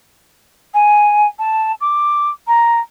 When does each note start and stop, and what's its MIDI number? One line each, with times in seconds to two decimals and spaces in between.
0.74 1.27 80
1.39 1.72 81
1.80 2.30 86
2.47 2.79 82